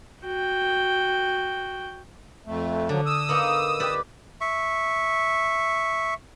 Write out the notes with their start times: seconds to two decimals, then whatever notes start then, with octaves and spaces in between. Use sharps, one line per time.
0.22 F#4 G5
2.46 F2 A3
2.89 D3 F3 F#3
3.06 D#6 E6
3.29 A#3 B3 D#4
3.80 G4 B4 D5
4.41 E5 C#6